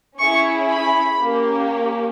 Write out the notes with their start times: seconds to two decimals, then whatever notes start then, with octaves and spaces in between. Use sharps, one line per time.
0.18 C#4 E4 G#4 C#6
0.69 B5
1.20 A#3 C#4 G4